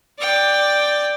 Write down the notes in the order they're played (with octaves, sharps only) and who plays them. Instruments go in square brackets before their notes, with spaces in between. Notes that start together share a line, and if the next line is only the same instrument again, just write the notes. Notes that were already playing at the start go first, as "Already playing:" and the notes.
[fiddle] D5 G5